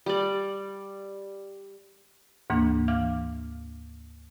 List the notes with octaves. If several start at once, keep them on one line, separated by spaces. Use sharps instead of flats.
G3 D5
D2 G#2 E3 A#3 D4
E3 F5 D6 F6